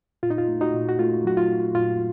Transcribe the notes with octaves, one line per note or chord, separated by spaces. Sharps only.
A#2 F4
D#4
F4
A3
D#4 F#4
A#2
F#4
A3 F4
F#3 F#4
F4
A3
A#2 F4